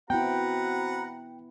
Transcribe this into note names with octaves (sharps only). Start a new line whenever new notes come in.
B3 C4 E4 F#4 B4 F#5 G5 A#5